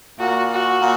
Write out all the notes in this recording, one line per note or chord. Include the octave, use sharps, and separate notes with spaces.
A#2 F#4
F#4
A#2